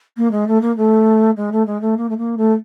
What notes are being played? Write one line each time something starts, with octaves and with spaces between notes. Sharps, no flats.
A#3
G#3
A3
A#3
A3
G#3
A3
G#3
A3
A#3
A3
A#3
A3